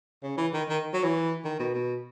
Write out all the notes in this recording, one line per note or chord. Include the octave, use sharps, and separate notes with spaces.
C#3
E3
D#3
D#3
F#3
E3
D#3
B2
B2